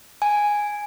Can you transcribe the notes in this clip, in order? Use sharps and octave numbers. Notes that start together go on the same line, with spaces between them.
G#5